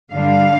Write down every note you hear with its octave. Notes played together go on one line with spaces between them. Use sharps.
G2 D3 G3 D4 F5